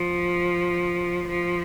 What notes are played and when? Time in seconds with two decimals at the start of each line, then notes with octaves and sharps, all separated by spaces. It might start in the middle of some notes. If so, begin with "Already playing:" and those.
Already playing: F3
1.27 F3